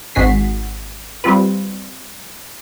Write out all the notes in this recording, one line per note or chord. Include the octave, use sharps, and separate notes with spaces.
G#1 G#2 F#4 G#4 B6 C7
G3 C4 F4 B4